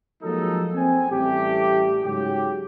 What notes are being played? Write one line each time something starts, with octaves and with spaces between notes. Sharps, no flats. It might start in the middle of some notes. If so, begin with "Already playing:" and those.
F3 F#3 G#3 A#3 D#4 A4
C4 G#5
A1 G3 A3 G4
G#2 C#3 F#3 G#3 G4